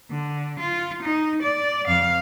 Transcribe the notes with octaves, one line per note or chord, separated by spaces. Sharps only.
D3
F4
D#4
D5
F2 F5